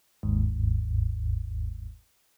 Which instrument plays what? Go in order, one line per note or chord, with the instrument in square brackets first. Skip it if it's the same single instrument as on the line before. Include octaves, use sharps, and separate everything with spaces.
[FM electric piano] G1 D#2 G#2